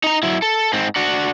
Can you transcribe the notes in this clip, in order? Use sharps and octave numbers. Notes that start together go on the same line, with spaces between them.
D#4 A#5
F#3 E4
A4
G#2 C4
D4 F#4